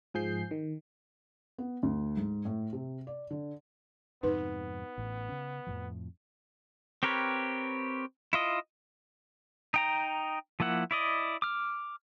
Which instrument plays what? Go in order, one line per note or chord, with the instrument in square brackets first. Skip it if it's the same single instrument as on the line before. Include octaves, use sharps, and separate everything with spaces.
[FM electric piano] G#2 F3 G#4 G6 C7
D#3
[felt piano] B3
D2
G#2
A2
C3
D5
D3
[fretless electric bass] F2 G#2 C3 [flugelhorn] B3 [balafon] D#4 B4
[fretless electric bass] A1 A2
C#3 C#4
F2 A2 F3
[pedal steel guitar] C4 G4 A#4 B4 C#5
E4 F4 D#5
D#4 G5 A#5
F3 A#3 E4 F#5
E4 D5 D#5
D6 F6